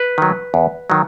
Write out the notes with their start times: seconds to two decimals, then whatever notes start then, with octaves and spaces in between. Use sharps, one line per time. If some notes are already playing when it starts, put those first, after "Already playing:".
Already playing: B4
0.18 D#3 F#3
0.54 E2
0.90 D#3 F#3